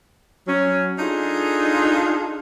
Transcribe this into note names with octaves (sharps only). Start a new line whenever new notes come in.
F#3 C#4
D4 D#4 F4 G#4 A4